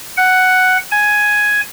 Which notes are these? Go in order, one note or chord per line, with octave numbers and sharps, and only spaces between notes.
F#5
G#5